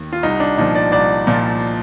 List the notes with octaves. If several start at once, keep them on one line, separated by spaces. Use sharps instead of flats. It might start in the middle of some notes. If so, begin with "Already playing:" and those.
Already playing: D#2 D#3
F4
C2 D#4
D4
A#2 F3 D#4
D5
C2 D5
A#2 F3